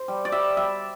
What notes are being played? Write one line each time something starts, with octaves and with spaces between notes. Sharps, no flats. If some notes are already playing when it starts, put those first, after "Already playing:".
Already playing: C5
G3
D5
G3 E5
G3 E5